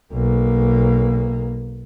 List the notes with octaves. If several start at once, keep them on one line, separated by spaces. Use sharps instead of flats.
B1 A#3